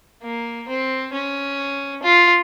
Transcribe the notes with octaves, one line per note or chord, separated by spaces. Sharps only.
A#3
C4
C#4
F4